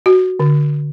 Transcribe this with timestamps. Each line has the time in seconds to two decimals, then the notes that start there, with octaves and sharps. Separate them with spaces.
0.06 F#4
0.40 D3